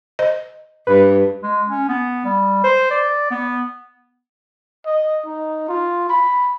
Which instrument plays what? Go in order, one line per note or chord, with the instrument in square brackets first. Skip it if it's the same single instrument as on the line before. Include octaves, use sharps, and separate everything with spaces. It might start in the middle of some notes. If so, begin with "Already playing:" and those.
[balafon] C5 D#5
[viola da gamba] G2 [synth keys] B4
[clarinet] G#3
C#4
B3
G3
C5
D5
B3
[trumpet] D#5
D#4
F4
B5